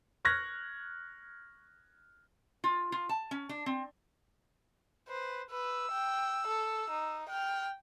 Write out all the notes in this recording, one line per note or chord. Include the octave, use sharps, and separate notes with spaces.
C#6 F6 F#6 G#6 A#6
F4
F4
A5
C#4
D4
C4
B4 C5
B4 E6
G5
A4
D#4
G5 F6